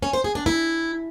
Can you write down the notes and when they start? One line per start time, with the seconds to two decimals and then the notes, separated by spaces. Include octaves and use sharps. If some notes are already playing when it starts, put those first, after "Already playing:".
0.03 C#4
0.13 C5
0.24 G#4
0.35 D4
0.46 E4